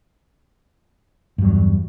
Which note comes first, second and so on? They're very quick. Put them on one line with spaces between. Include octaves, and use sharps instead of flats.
G2 F#3 E2